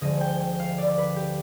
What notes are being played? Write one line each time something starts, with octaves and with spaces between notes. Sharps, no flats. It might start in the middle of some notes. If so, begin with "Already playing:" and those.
D2 D3 F3 G#3 D#5
G5
G5
F5
D5
B4
G4